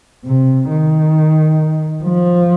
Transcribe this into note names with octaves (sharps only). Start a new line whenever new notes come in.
C3
D#3
F3